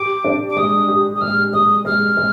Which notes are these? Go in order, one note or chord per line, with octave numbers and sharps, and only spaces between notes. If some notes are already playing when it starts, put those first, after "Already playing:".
Already playing: G4 D6
D4
D6
G#3 D#6
G4
D#6
G#3 F6
G#3 D#6
G#3 F6
G#3